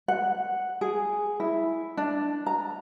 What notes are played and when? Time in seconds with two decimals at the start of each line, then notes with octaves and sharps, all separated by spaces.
0.08 F#5
0.81 G#4
1.40 E4
1.97 D4
2.46 A#5